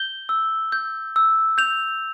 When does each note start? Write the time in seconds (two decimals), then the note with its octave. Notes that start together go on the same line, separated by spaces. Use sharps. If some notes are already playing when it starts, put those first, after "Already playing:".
Already playing: G6 G7
0.29 E6
0.72 G6
1.16 E6
1.58 G6 F7